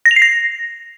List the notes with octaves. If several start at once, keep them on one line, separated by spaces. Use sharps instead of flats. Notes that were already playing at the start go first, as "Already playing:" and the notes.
A#6
F7
C7
A#6